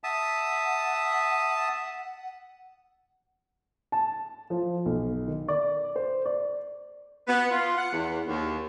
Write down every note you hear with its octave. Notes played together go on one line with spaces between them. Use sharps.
E5 F#5 A5 D#6
A5
F3
B1
D#3
D5
C5
D5
B3
F4
F#5
E2
D#2